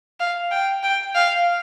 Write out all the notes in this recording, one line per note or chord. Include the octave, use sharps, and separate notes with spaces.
F5
G5
G5
F5